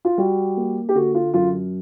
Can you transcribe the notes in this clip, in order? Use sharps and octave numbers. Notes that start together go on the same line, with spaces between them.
F4
G3 F#4
A#3
G4
D3 F#4
F4
F#2 F4